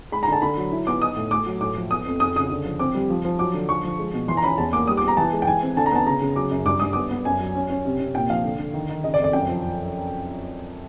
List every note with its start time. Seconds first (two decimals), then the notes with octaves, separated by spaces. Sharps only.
0.12 G#3 B5
0.23 A#5
0.28 D3 A5
0.42 D3 B5
0.57 F#3
0.72 E4
0.87 B3 D6
1.02 D#4 D#6
1.16 A2
1.31 A3 D6
1.46 F#3
1.61 A2 D6
1.76 F3
1.91 B3 D#6
2.06 F2
2.20 F2 D#6
2.36 C#3 D#6
2.50 D3
2.65 F3
2.79 C4 D6
2.95 G3
3.10 F3
3.25 F3
3.39 F#3 D6
3.54 D3
3.69 F3 C#6
3.84 F3
3.99 G#3
4.13 B2
4.28 E3 C6
4.37 A#5
4.43 C#4 B5
4.58 E2 A5
4.73 A#3 D6
4.87 G3 D#6
4.97 D6
5.02 B3
5.08 A#5
5.17 E3 A5
5.33 G#3
5.42 G5
5.47 E3 G#5
5.62 C4
5.77 D3 A5
5.86 A#5
5.92 B3 A5
6.06 C#3 A#5
6.22 C#3
6.36 F#3 D6
6.51 F#2
6.66 G2 D6
6.80 G2 D#6
6.93 B3 D6
7.11 B3
7.25 F#2 G#5
7.40 F#3
7.55 C#4
7.70 C#4
7.85 C3
8.00 C3
8.15 A#2 G5
8.29 F3 F5
8.44 D3
8.59 D3
8.74 D#3
8.89 D#3
9.04 C#3 D#5
9.14 D5
9.19 F2
9.24 D5
9.33 F#2 G5
9.48 F3